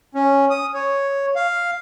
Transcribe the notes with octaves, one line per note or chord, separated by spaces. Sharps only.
C#4
D#6
C#5
F5